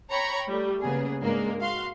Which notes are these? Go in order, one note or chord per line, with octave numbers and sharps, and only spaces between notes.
C#5 G5 A#5 B5 C#6
G3 A3
C#3 A#3 B3 G#4
G#2 G#3 A#3 D4
F#4 F5 C6